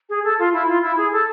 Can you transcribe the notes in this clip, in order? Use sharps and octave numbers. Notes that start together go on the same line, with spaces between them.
G#4
A4
F4
E4
F4
E4
G#4
A4